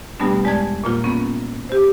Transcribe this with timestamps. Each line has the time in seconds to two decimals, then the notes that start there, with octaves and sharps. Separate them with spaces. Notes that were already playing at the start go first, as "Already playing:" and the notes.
0.20 G2 B2 G3 A3 B3 D4
0.44 E2 G#3 D5 A5 G#6
0.84 A#2 A#3 F4
1.04 A#3 B3 C#4
1.69 G4 C5